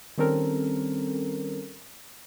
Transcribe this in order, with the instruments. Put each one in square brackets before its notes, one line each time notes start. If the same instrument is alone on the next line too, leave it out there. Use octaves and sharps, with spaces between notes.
[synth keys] D#3 G3 C4 C#4 A4 A#4